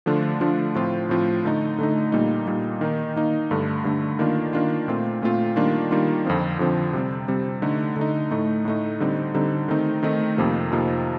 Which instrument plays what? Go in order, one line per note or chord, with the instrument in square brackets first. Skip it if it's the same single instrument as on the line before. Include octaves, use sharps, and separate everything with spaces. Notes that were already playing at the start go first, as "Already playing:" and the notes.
[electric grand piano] D3 F3 A3 D4 F4
D3 F3 A3 D4 F4
A2 F3 C4 F4
A2 F3 C4 F4
D3 A3 D#4
D3 A3 D#4
A#2 G3 A#3 D#4
A#2 G3 A#3 D#4
D#3 A#3 D#4
D#3 A#3 D#4
G2 D3 A3
G2 D3 A3
D#3 A#3 D4 F4
D#3 A#3 D4 F4
A#2 A3 C4 F4
A#2 A3 C4 F4
D#3 G3 A#3 D4 F4
D#3 G3 A#3 D4 F4
F2 D3 F3 C4
F2 D3 F3 C4
C3 G3 C4
C3 G3 C4
D3 A3 D#4
D3 A3 D#4
A2 A3 D#4
A2 A3 D#4
D3 G3 C4 D#4
D3 G3 C4 D#4
D#3 A3 C4 D#4
D#3 A3 C4 D#4
F2 C3 F3 A#3 D#4
F2 C3 F3 A#3 D#4